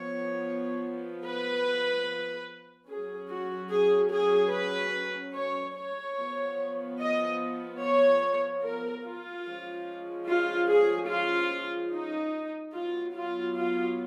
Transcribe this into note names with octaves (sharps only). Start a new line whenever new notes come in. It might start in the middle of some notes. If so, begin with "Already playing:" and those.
Already playing: F3 B3 C#5
B4
F#3 C#4 G#4
F#4
G#4
G#4
B4
C#5
C#5
F3 B3
D#5
C#5
A#4
F4
F3 G#3 C#4
F4
G#4
F4
D#4
F#3 B3 F4
F4
F4